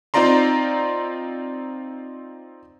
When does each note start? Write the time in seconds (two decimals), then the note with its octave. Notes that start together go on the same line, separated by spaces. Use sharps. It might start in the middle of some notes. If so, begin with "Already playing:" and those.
0.14 C4 D#4 F4 D5 A#5 C6